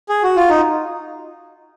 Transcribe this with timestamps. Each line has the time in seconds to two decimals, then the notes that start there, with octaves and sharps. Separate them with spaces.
0.09 G#4
0.23 F#4
0.36 F4
0.49 D#4